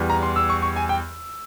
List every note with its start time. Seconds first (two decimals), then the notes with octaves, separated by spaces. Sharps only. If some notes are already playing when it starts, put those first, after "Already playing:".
Already playing: E2 E3 G3
0.10 A#5
0.23 C6
0.36 E6
0.49 C#6
0.62 C#6
0.76 G#5
0.89 G5